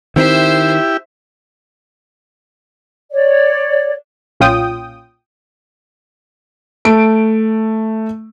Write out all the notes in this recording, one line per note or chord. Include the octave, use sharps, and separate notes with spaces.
D#3 C4 E4 G4 C5 E5
C#5 D5
B1 A#2 C#4 F4 G5 D#6
A3 D7